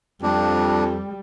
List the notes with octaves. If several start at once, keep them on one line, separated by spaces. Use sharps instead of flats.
F2 G3 D4